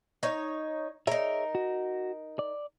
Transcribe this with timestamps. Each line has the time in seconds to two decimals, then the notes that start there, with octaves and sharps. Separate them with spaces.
0.23 D#4 C#5
1.07 D#4 G#4 A#4 C#5 E5
1.55 F#4
2.39 D5